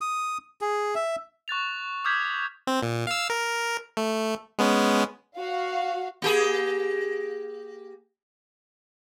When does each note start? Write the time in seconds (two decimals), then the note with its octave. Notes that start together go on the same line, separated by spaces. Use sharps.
0.01 D#6
0.61 G#4
0.95 E5
1.48 C#6 F#6 A6 F7
2.05 D6 D#6 F6 G6 G#6 B6
2.67 C4
2.83 A#2
3.07 F5 E6
3.30 A#4
3.97 A3
4.59 G#3 B3 C#4
5.36 F#4 F5
6.22 A#3 G4 G#4